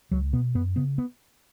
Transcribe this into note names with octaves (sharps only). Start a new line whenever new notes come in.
C#2 F#3
B2 B3
F#2 B3
C#3 B3
B3